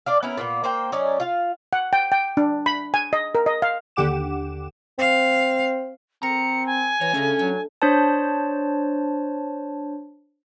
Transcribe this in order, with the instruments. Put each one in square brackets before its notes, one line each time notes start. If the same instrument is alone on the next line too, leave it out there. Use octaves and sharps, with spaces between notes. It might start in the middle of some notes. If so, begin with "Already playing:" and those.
[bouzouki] D4 D5 F5
B3 C#4 E4 A#4
A#2 A#3 B3
A#3 C5 G5
F#3 C#4 D#4 D5
F4 F5
[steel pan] F#5
G5
G5
D4
B5
G#5
D#5
A#4
D#5
F5
[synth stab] D#2 D3 G4 F#5 D6 E7
[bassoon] C4 [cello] F5
[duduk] C4 [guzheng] A#4 [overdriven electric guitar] A#5 [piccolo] C#7
[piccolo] G#5
[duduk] E3 [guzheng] F#4 [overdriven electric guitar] C#5
[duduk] C#3 [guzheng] A3 D4 A#5 [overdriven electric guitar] C#4
[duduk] F#3 [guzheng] G5
[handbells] D4 C5 C#5 A5